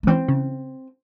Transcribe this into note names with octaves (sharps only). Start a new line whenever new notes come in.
A3
E3 C4
C#3